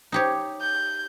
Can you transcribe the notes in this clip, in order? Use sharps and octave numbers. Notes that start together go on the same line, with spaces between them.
D#4 G4 C#5
G6